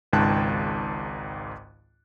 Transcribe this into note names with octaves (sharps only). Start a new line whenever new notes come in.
G#1 C#2 G#2 G5 A5 F#6